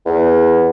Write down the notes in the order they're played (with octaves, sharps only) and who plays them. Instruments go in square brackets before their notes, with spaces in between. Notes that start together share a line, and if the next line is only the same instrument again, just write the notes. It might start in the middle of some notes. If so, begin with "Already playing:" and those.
[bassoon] E2